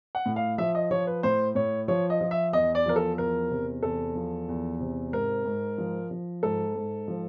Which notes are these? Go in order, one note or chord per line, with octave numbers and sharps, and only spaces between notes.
F#5
A2
F5
F3 E5
D#5
F3 C#5
B4
A2 C5
A2 C#5
F3 C#5
D#5
F3
E5
E2 D#5
D5
F3 A#4
A4
E2 A#4
C3
E2 A4
F3
E2
C3
G#2 A#4
G#2
F3
F3
G#2 A4
G#2
F3